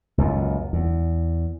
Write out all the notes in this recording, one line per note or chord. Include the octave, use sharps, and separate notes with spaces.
C#2 F#2 A#2
E2